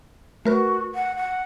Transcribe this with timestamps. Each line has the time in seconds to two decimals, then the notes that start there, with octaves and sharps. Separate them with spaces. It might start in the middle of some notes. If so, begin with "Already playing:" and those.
0.45 A3 F#4 A#4 B4
0.95 F#5
1.16 F#5